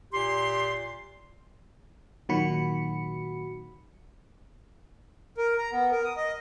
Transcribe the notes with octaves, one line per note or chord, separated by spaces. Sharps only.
A#2 G4 C6
A#2 D#3 F#3 F#4 B5 C#7
A#4
A#5
B3
A#4
D#6
D#5